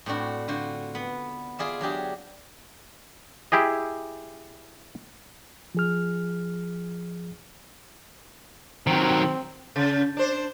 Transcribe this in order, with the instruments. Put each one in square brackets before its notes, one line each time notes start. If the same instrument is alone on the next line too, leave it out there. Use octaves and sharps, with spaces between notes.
[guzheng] A2 C4 D4 F#4
D3 F4 F#4 C5
B3
F4 G#4 D5 E5
F#3 D4 G4 G#4
[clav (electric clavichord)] E4 G4 G#4 D#5
[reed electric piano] F3 G#4 F6
[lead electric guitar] D#3 F#3 [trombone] C4
[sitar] C#3
D4 C5